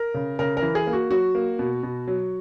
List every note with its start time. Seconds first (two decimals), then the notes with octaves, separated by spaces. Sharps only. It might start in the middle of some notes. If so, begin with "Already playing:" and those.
Already playing: A#4
0.14 C#3
0.39 C#3 A#4
0.57 A#4
0.62 E3
0.75 G#4
0.87 A#3
0.93 F#4
1.11 F#3 F#4
1.35 A#3
1.59 B2
1.83 B2
2.08 F#3